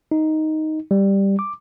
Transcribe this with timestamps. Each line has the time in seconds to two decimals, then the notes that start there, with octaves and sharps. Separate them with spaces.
0.11 D#4
0.91 G3
1.39 D6